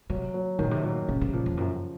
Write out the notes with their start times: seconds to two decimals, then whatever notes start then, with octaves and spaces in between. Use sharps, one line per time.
0.10 C3 F#3
0.34 F#3
0.59 A#2 D#3
0.71 C3
0.84 A#2 F#3
1.08 A#2 C#3
1.21 C3
1.33 A#2 F3
1.46 F2
1.57 F#2 F3